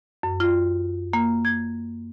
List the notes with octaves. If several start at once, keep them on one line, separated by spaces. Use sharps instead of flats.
F#2
F4
A#3
G#6